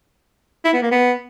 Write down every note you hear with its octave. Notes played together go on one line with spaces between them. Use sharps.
E4
B3
A#3
B3